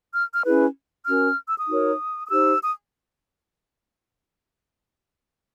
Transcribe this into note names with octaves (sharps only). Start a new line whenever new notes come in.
F6
F6
C#4 E4 G#4 B4
C#4 F#4 A#4 F6
E6
D#6
D#4 F#4 A#4 C#5
D#6
D#4 G4 C5 E6
D#6